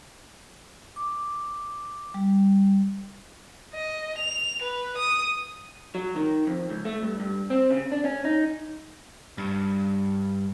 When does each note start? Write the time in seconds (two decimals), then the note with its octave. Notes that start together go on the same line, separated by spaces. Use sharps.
0.96 D6
2.14 G3
3.74 D#5
4.18 F7
4.62 B4
4.97 D#6
5.95 F#3
6.16 D#3
6.47 F2
6.70 C#2
6.85 A3
7.02 G2
7.20 G2
7.50 C4
7.70 C#3
7.92 D4
8.05 C#4
8.25 D#4
9.38 G2